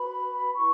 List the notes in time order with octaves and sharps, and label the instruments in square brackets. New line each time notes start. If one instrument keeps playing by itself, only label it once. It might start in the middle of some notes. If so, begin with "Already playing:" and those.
Already playing: [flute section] F#4 B4 B5
E4 B4 C#6